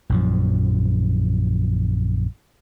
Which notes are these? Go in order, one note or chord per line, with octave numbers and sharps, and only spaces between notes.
A#1 F#2 F3